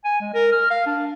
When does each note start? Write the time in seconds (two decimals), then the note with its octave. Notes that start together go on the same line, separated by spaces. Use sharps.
0.05 G#5
0.21 G#3
0.34 A#4
0.52 F6
0.70 F5
0.86 D4